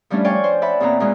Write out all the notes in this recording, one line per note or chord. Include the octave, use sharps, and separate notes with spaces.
F3 G3 A3 C#4 D4 E4
C#5 D5 F5 G5 G#5 C#6
C5
D5 E5 F#5 B5
E2 A#2 C4 A#5
E2 B2 G#3 F4 F#6